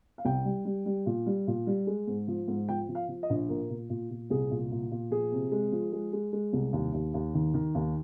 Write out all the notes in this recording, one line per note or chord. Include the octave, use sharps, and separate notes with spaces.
F5
C2 G5
G3
G3
G3
A#2
G3
A#2
G3
G#3
G#2
F3
G#2
F3 G5
F3
F5
F3
D#5
A#1
A#2 A#4
A#2
A#2
A#2
C2 G#4
A#2
A#2
A#2
F3 G#4
C3
G#3
F3
G#3
G#3
G#3
C2
D#2
D#2
D#2
D#3
D#3
D#2